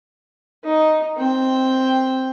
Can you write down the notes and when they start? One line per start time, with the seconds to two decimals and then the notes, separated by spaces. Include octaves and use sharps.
0.64 D#4
1.17 C4 G5